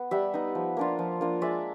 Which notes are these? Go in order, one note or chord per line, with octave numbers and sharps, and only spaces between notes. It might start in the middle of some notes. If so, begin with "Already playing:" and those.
Already playing: B3
G3 E5 F#5
B3 D#4
F3
A#3 D4 F4
F3
A#3 D4 F4
G#3 D5 E5